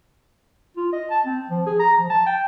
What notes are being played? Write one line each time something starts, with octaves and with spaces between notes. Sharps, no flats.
F4
D#5
A5
C4
F3
G#4
A#5
F3
A5
G5